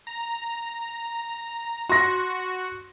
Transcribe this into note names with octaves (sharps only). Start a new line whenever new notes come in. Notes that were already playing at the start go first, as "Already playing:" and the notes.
A#5
F#4 C6 A#6